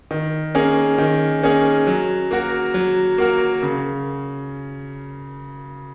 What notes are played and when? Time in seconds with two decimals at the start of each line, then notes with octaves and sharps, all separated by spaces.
0.11 D#3
0.55 A#3 C#4 G#4
0.98 D#3
1.43 A#3 C#4 G#4
1.87 F#3
2.31 A#3 F#4 A#4
2.74 F#3
3.18 A#3 F#4 A#4
3.63 C#3